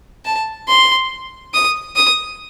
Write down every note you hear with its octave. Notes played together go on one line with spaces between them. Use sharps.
A5
C6
D#6
D#6